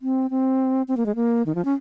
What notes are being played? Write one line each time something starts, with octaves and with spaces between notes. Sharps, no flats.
C4
C4
C4
A#3
G#3
A#3
D#3
F3
C#4